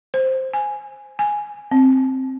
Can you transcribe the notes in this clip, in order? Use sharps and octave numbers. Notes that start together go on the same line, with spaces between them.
C5
G#5
G#5
C4